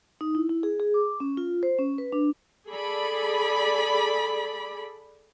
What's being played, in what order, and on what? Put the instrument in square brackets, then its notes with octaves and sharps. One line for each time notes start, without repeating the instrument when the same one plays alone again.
[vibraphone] D#4
E4
E4
G#4
G#4
D6
C#4
F4
C5
C#4
B4
D4
[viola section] G#4 A4 D5 B5